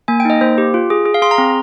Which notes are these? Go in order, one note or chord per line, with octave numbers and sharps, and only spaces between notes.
A#3 G#5
G5
D#4 D#5
A#3 C5
G4
F4
G#4
G#4
F5
G#4 C6
A#5
C4